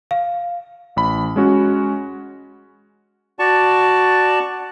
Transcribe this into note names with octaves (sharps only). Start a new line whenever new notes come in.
F5
A1 B5
G#3 C#4 F#4
F#4 D5 A5 C#6